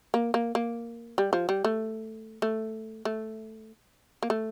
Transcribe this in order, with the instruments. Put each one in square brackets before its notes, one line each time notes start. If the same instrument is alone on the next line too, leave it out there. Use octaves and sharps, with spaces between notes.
[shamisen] A#3
A#3
A#3
G3
F3
G3
A3
A3
A3
A#3
A3